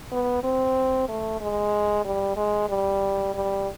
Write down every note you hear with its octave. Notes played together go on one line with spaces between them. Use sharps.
B3
C4
A3
G#3
G3
G#3
G3
G3